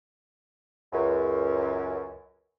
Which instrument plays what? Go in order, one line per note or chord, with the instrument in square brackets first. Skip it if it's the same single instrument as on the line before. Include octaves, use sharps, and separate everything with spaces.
[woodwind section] C#2 F#2